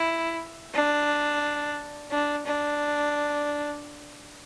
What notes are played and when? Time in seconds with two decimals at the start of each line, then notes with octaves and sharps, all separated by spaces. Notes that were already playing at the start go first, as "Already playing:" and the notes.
Already playing: E4
0.74 D4
2.11 D4
2.46 D4